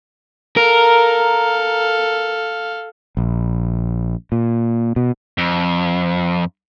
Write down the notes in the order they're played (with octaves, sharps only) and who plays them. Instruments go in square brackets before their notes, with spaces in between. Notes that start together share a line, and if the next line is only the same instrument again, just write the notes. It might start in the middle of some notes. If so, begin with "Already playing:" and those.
[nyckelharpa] A4 F5 [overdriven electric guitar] A#4
[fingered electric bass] A#1
A#2
B2
[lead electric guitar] F2